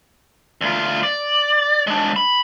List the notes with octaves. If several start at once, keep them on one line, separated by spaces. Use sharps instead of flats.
D2 F4
D5
G#3 D4
B5